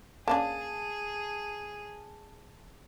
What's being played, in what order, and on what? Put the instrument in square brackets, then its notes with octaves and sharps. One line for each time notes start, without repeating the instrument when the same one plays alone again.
[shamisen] A#3 C#4 D4 [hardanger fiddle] G#4 [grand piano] A5